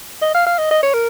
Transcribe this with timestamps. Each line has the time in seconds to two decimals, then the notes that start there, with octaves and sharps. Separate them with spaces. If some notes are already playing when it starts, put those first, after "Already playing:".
0.22 D#5
0.35 F5
0.46 F5
0.58 D#5
0.71 D#5
0.83 C#5
0.94 A#4